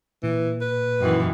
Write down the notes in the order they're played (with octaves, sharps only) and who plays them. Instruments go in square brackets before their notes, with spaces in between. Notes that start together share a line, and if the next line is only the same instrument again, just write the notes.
[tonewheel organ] A#2 [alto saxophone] E3
[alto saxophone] B4
[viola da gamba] F#2 D#3 E3